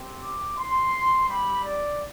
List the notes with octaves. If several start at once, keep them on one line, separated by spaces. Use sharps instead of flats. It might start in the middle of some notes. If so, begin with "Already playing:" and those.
Already playing: C4 G4
D6
C6
G3 C4 G4 B5
D5